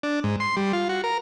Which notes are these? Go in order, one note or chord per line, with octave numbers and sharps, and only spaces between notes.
D4
G#2
C6
G3
F4
F#4
A#4